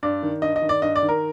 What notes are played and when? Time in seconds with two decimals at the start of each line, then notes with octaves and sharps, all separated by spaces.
0.03 G2 D5
0.23 D#3
0.42 G2 D#5
0.56 D#5
0.62 D#3
0.69 D5
0.82 G2 D#5
0.96 D5
1.03 D#3
1.09 A#4